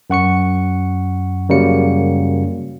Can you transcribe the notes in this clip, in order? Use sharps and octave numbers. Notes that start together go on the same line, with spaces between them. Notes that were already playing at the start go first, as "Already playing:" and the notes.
F#2 F#5 C#6 C#7
F#2 C#3 F#3 G3 A#3 C#7